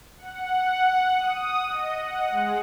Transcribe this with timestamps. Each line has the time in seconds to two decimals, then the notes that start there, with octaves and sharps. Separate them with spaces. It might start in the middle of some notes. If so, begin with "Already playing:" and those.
0.17 F#5
1.18 D#6
1.67 D#5
1.99 F#5
2.31 G#3